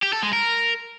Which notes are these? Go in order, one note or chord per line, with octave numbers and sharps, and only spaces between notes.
G4
A4
G#3
A#4